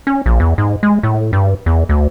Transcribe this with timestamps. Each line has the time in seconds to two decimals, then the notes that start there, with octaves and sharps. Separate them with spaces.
0.07 C#4
0.26 A#1
0.40 E2
0.58 G#2
0.83 G#3
1.03 A2
1.33 G2
1.66 E2
1.89 D2